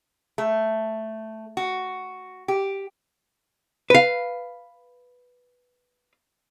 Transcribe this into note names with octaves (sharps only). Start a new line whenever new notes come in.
A3
F#4
G4
B4 F5